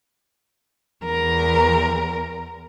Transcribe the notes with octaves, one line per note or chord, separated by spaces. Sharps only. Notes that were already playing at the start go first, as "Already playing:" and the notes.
E2 A#4